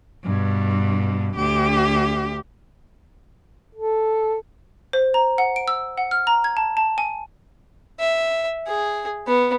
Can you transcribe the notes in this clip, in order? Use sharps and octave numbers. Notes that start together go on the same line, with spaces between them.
G2 B2
D2 G4
A4
C5
A#5
F#5
D7
E6
F#5
F6
A#5
G#6
A5
A5
G#5
E5
G#4
B3